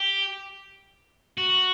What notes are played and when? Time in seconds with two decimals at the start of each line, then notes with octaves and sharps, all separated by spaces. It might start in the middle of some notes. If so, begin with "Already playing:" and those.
Already playing: G4
1.38 F#4